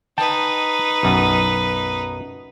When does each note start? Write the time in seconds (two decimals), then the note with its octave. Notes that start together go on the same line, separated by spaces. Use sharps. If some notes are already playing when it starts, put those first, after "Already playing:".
0.18 D#4 B4 G5 A5
1.03 B1 F#2